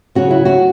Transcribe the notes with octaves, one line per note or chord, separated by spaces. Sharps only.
C#3 F#3 C#4 F#4
E4
F#4